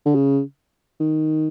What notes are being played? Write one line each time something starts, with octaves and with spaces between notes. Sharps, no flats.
D3
C#3
D#3